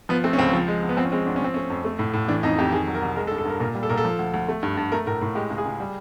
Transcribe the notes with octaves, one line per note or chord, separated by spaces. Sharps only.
F3 B3
A3 C4
C#4
C#2 C4
F3
G#3
E2
B3
F3 C4
C#4
G#3 C4
D2 D4
C#4
F3 C4
A3 C#4
F2
A3
A2
A2
E3 D4
F2 D#4
F2 G4
D#3 G#4
F#3
A#4
C2
G#3 A#4
A4
G2
A4
G2 A#4
A#2 A#4
G3
A4
A#2 A#4
A4
F3
D2
D2
A3
G2
G2
A3 A#4
A2 A#4
A2
G#3 G4
C#2
G#4
C#2
G3